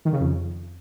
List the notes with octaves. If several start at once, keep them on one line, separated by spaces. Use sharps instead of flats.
D#3
C#3
F2